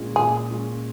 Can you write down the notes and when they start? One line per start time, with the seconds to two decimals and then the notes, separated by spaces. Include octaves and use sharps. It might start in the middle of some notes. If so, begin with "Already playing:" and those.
Already playing: A#2 G#3 C#4 F4
0.15 A#2 G#4
0.50 G#3 C#4 F4